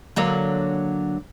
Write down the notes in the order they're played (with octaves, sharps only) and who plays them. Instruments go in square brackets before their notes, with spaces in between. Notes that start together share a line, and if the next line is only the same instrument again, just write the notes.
[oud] D3 F#3 A#3